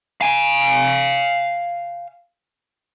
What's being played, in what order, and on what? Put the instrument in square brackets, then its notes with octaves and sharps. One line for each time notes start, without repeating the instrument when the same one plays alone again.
[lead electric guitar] F5 G#5